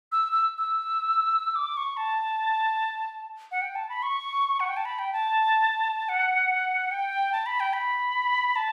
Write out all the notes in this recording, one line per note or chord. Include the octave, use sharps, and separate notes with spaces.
E6
E6
E6
D6
C#6
A5
F#5
G5
A5
B5
C#6
F#5
G5
A5
B5
G5
A5
F#5
G5
A5
B5
G5
B5
A5